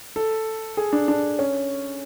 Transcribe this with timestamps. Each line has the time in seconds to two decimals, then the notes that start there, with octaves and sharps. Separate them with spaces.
0.16 A4
0.77 G#4
0.93 D4
1.08 D4
1.39 C#4